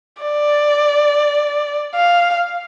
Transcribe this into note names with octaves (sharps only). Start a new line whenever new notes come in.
D5
F5